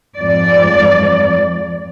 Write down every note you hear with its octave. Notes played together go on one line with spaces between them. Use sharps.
F2 G#2 D5